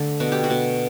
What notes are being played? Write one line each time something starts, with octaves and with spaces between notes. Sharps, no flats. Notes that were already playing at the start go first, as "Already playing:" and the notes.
Already playing: D3 A3
B2 F#4
G4
F#4
B2